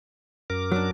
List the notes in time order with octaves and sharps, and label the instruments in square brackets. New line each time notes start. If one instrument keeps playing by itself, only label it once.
[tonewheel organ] F#2 A#4 D6
[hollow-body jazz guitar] F#3 D4